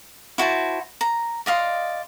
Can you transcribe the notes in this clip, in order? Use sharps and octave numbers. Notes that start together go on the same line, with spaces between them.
E4 F#4 C5 A5
A#5
D5 D#5 F5 C6